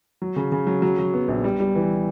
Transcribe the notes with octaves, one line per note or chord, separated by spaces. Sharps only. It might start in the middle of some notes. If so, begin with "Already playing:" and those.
F#3
C#3
C#3
F#3
F#3
F#3
B3
A#1
G3
G3
E3